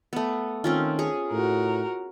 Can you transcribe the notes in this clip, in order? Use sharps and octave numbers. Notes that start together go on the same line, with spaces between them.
A3 B3
D#3 C4 C#4 F4
G#4 C#5
A2 F#4 A#4